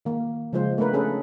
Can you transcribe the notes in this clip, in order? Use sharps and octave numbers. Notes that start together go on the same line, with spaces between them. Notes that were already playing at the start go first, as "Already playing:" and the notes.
D#3 A#3
C#3 F3 G#3 F4 C5
A3 B3 D4 A#4 B4
C#4 G#4 A4 B4